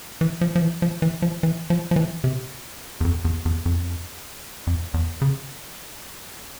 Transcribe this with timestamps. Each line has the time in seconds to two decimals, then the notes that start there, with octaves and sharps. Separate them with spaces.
0.21 E3
0.41 F3
0.56 F3
0.62 E3
0.82 F3
1.02 E3
1.22 F3
1.43 E3
1.70 F3
1.91 F3
1.96 E3
2.24 C3
3.01 E2
3.05 F2
3.25 E2
3.45 E2
3.66 F2
4.67 F2
4.94 E2
5.22 C#3